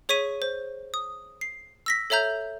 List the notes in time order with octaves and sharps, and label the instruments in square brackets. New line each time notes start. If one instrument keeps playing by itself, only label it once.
[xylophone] G#4 C#5 C#6 B6 D#7
C5
D#6
C7
E6 A#6 B6
A4 C#5 E5 A#5 G6